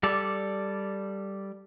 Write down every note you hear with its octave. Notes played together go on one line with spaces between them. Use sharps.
G3 A4 D5